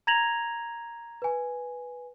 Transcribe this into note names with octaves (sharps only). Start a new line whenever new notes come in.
A#5 G#6 A#6 F7 F#7
B4 G#5